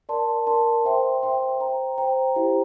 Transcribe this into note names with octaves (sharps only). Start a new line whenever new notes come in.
A#4 D5 A5 C6
A#4 D5 A5 C6
C5 E5 G5 C6
C5 E5 G5 C6
C5 G5 A#5
C5 G5 A#5
E4 G4 C5 F5 A#5